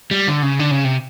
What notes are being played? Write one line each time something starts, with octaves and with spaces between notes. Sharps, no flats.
G3
D3
C#3
D3
C#3
C3